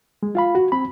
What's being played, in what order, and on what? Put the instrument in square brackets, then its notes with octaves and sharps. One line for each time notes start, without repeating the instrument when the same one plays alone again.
[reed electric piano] G#3
F4 F5 B5
F#4
C4 B5